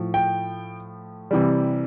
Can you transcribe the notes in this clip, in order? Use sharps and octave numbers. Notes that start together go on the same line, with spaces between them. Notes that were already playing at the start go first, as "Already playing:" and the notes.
Already playing: A2 F3
G5
C3 E3 G3